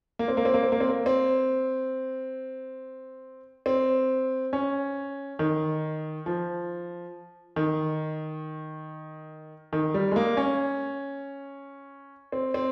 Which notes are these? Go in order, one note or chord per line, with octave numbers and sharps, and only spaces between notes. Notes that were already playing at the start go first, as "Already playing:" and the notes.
A#3
C4
A#3
C4
A#3
C4
A#3
C4
A#3
C4
C4
C#4
D#3
F3
D#3
D#3
G3
G#3
A#3
C#4
C4
C4